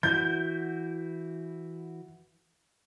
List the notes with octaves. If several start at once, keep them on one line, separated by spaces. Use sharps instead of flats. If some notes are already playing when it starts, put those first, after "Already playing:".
E3 E4 F#4 G6